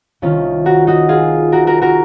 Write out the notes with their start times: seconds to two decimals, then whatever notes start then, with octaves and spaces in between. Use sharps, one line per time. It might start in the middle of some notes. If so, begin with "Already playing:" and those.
0.22 C2 C3 D#3 C#4 F4
0.66 F#4 A#4
0.87 D#4 F#4
1.09 F4 G#4
1.52 F#4 A#4
1.67 F#4 A#4
1.82 F#4 A#4